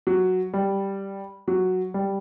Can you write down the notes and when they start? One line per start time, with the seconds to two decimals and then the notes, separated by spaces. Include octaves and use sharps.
0.07 F#3
0.54 G3
1.48 F#3
1.94 G3